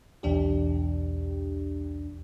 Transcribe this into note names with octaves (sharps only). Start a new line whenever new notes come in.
B1 E2 D4 G4